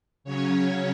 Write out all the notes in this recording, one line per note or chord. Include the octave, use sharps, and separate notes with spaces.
C#3 F#3 C#4 C#5